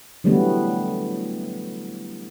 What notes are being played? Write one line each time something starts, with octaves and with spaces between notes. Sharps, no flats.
D3 E3 F#3 G3 A3 B3